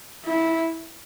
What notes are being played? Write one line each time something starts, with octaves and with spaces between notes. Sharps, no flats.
E4